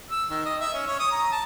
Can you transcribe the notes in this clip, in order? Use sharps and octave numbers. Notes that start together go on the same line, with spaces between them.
E6
D#3
D#5
E5
C#4
C#5
D#6
A#5
A5